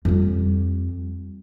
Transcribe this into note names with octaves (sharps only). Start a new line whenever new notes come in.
F2 G3